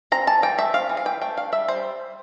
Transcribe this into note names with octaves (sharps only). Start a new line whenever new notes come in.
C4 A#5
E3 A5
E3 G5
A3 E5
C4 F5
E3
F5
E3 G5
A3 G5
D4 F5
G3 E5
G3 C5